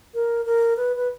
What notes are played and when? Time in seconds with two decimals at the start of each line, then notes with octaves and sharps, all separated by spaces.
0.14 A#4
0.45 A#4
0.77 B4
0.96 B4